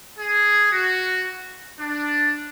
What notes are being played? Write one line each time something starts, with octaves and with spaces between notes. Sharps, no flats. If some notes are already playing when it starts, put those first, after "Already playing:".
G#4
F#4
D4